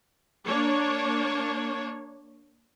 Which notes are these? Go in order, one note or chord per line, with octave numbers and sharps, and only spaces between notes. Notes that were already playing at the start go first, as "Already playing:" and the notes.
A#3 D4 C#5